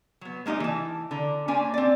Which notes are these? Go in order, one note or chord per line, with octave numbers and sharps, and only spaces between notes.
F#3 B3
G#3 A#3 D#4 G4 D#5
E3 A5
D3 A#5
A#3 C#4 D4 C5 G#5
C4 D5